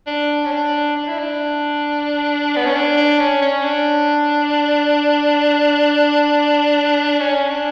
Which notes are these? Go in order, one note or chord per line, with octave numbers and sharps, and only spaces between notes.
D4
C#4
D4
D4
E4
D4
B3
C#4
D4
D4
C#4
C#4
D4
C#4
D4